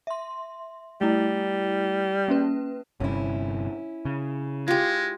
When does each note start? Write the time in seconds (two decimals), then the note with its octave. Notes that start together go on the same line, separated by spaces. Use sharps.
0.07 E5 C6
1.01 G3 A3 E4
2.28 A#3 C#4 B4
3.00 G1 G2 C3 C#4 E4
4.05 C#3
4.68 G#3 F4 G4